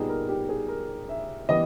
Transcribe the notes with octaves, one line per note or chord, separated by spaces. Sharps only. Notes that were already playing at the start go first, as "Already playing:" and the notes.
Already playing: A#2 G3 B3 D#4 G#4
A#4
G4
G#4
A#4
E5
E3 G3 B3 D#5